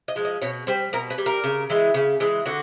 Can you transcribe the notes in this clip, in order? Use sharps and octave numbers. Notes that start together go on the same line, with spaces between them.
D#5
F3 G#3
D#5
B2 C#5
G3 C5
B2 A#4
B4
G3
A#4
C#3
E3 G#3
C#3
E3 G#3
D3 F#4